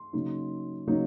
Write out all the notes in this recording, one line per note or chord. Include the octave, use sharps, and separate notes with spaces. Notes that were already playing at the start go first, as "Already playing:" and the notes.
Already playing: C6
C#3 F#3 A#3 D#4
C#3 F#3 A#3 D#4